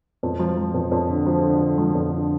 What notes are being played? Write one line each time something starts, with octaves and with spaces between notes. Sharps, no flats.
F2
F3
F3
F2
F2
D3
F3
D3
D3
F3
F2
D3